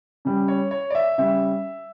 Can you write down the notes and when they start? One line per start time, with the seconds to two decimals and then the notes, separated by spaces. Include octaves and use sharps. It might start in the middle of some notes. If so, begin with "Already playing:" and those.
0.25 C#3 G3
0.48 C#5
0.71 C#5
0.90 D5
0.95 E5
1.18 C#3 G3 E5